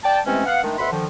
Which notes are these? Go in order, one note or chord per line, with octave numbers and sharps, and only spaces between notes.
D5 G5 A5
C3 E3 G#3 A3 C4 C#4
B3 F5 F#5
D#3 G#3 A3 D4
D2 B2 E5 F#5 B5 C6
D3 D#3 F3